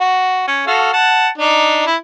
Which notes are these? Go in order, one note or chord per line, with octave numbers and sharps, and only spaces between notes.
F#4
C#4
F#4 A4 F5
F#5 A5
D4 D#4
E4